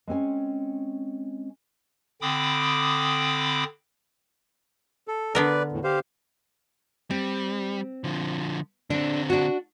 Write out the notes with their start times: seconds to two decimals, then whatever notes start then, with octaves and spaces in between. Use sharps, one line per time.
0.07 G#3 C4 C#4 G#5
2.21 D3 C4 G5 B5 D6 D#6
5.08 A4
5.35 D3 B3 A#4 B4 D5
5.72 E2 A2
5.84 G4 C5 F5
7.10 G3 C4
8.04 D3 F3
8.90 D3 C4 D4 A4
9.30 D4 F#4